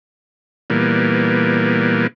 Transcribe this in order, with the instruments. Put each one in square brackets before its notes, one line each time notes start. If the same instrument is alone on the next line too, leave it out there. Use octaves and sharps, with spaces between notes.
[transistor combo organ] A#2 E3 G3 A#3 B3